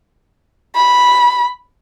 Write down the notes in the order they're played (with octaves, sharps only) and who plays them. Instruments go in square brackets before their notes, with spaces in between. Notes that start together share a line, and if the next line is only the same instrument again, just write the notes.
[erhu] B5